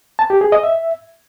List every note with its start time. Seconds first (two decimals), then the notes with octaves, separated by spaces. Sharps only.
0.19 A5
0.30 G4
0.41 G#4
0.52 D#5
0.63 E5